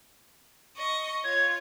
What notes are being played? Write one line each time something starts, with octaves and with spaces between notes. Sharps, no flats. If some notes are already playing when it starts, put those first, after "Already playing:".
D#5 C#6
F4 C#5 G#6